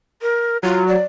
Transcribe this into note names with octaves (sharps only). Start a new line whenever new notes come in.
A#4
F#3 F4
D5